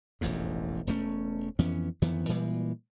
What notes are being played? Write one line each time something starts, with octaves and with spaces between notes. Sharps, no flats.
E1 A1 F2 G#2
E1 G2 A3 C#4
F2 E3 B3 C#4
F2 D#3 E3 B3
A#2 E3 G3 G#3